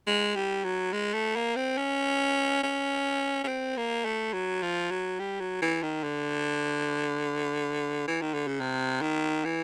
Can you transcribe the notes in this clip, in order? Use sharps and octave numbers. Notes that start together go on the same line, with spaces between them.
G#3
G3
F#3
G#3
A3
A#3
C4
C#4
C#4
C#4
C4
A#3
A3
F#3
F3
F#3
G3
F#3
E3
D#3
D3
E3
D#3
D3
C#3
C3
D#3
E3